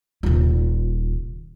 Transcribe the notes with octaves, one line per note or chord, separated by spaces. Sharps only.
D#1 F4